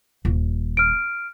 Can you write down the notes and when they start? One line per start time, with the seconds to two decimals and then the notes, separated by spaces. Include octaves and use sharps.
0.25 D#1
0.77 F6 D7